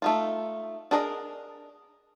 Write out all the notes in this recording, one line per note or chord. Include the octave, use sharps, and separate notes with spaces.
A3 D#4 F4
D4 G#4 A#4 B4 D#5